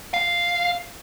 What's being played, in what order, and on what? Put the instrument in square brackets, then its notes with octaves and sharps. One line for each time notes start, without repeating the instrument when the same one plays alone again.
[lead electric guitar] F5